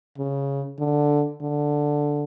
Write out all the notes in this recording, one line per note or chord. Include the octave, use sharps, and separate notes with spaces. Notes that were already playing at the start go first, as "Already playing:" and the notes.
C#3
D3
D3